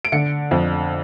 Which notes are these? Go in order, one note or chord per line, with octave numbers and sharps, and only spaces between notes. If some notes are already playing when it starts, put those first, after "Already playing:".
D7
D3 C#7
F2